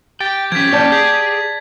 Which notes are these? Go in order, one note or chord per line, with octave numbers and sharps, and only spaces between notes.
G4 G5 A6
F3 C#4 G#6 B6
A#3 C#4 D5 A5 G6
G#4 G#6